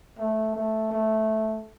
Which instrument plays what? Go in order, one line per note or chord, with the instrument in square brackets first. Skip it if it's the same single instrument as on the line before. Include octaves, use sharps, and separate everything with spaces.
[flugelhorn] A3
A3
A3